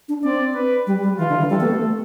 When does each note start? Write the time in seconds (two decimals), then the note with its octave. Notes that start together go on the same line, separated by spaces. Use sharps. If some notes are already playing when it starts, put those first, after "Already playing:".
0.09 D4
0.24 C4 D5
0.55 B4
0.87 G3
1.03 G3
1.18 E3 F4
1.29 D3
1.39 E3
1.50 G3 A4
1.60 B3
1.65 A3